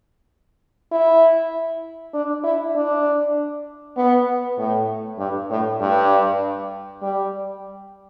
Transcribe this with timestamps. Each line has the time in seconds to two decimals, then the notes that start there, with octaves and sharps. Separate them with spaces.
0.92 E4
2.14 D4
2.44 E4
2.75 D4
3.97 B3
4.58 A2
5.19 G2
5.50 A2
5.80 G2
7.02 G3